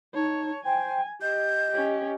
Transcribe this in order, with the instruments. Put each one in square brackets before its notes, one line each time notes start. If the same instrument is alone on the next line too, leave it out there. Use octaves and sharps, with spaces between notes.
[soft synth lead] D#4 [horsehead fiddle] C#5 [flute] A5
[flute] C5 [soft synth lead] G5 [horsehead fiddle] G#5
[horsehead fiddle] G4 [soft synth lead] D#5 [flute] G6
[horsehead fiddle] C#4 G4